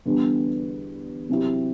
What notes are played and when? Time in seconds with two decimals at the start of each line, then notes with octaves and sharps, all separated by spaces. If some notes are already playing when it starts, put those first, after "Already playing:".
0.05 E2 D3 G3 B3 D4
1.29 C3 F#3 C4 E4 G4